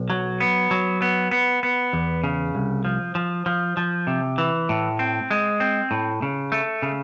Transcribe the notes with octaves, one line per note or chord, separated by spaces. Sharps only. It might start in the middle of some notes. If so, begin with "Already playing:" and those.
Already playing: B1
F#3
B3
F#3
B3
B3
B3
E2
C#3
C2
F3
F3
F3
F3
C3
E3
A2
C4
G#3
C4
A2
C#3
A3
C#3